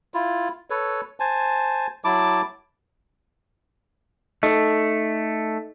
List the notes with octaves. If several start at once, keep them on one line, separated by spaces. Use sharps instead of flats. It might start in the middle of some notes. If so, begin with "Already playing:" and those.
E4 F4
A4 B4 C#5
C5 G#5 A5
F#3 E4 A5 D6
A3 D#4 A4 D#5